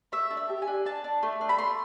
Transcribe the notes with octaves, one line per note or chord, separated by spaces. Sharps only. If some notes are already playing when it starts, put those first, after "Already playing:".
A3 E5
D4
E5
G4
G#5
D4
D4 A5
D4
A3
D4
B5
A3 C6